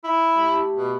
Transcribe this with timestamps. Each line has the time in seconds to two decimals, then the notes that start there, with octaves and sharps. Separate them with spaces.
0.04 E4
0.35 A3 G4
0.76 B2